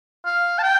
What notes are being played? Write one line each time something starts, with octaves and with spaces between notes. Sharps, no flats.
F5
A5
G5